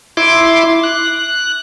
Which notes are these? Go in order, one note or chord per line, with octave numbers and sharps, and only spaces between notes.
E4 C6 D6
F#6